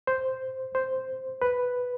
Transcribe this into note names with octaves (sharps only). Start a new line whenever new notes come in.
C5
C5
B4